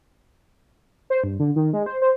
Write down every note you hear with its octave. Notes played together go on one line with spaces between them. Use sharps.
C5
G2
D3
D#3
G#3
C5
C5